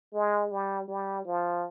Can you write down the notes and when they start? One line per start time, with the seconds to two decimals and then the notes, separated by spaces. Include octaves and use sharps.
0.14 G#3
0.51 G3
0.88 G3
1.26 F3